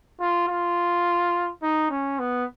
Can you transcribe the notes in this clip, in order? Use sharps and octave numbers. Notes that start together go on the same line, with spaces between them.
F4
F4
D#4
C#4
B3